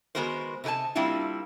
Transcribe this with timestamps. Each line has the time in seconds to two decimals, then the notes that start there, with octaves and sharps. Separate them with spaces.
0.15 D#3 G#3 B3 F#4 A#4 C5
0.64 C3 D#4 A#4 G#5 A5
0.95 G3 A#3 C4 D4 E4 F4